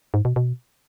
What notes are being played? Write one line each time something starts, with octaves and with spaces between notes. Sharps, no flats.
G#2
B2
B2